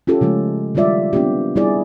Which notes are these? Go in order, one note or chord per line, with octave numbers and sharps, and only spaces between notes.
C#4 F4 G4 A4
C#3 F3 G#3 A3
D#3 G3 G#3 F4 D5 E5
B3 C4 D4 F4 G4
G3 B3 E4 G#4 D5